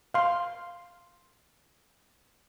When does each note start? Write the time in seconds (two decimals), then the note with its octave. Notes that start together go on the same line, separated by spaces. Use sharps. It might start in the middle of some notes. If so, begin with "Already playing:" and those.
0.14 F5 C6